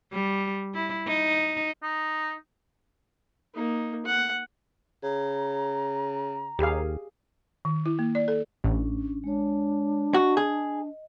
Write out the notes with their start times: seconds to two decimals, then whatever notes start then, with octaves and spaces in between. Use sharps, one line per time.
0.13 G3
0.74 E4
1.07 D#4
1.83 D#4
3.54 A#3 D#4
4.05 F#5
5.03 C#3 A#5
6.59 D#2 G4 G#4 F5
7.65 D#3
7.86 E4
7.99 A#3
8.15 D5
8.28 A4
8.64 A1 C#4 D4
9.24 G#3 D4 C#5
10.14 F#4 D#5
10.37 G#4